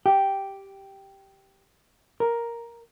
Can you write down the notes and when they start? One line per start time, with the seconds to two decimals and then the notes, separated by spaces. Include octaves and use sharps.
0.06 G4
2.20 A#4